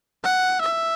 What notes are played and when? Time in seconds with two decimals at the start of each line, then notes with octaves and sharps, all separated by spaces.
0.23 F#5
0.61 E5